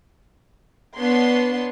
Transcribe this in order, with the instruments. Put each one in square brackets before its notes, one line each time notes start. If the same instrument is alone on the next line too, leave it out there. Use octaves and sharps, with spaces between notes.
[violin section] B3 D4 C#5 C6